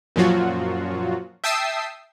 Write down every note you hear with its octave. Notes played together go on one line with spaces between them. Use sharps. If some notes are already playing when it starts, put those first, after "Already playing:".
F#2 A#2 F3 F#3 F4 F#4
E5 G5 A5 D#6 E6 C7